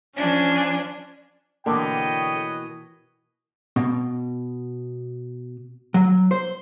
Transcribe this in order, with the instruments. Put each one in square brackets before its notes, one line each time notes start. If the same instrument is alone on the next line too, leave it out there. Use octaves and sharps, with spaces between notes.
[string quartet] F3 D4 [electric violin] C#4 G#5
[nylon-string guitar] B2 E3 A#3 [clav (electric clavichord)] D3 [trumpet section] B4 C#5 D#5 [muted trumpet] G5
[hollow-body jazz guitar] B2
F#3
C5